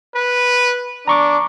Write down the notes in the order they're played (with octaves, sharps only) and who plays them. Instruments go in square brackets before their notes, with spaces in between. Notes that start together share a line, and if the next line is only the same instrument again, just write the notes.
[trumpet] B4
[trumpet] D4 [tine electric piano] A#5 C#6 D6